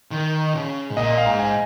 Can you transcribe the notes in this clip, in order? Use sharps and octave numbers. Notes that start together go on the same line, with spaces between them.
D#3
C#3
G#2
A#2 D#5
F5
G#2
G#5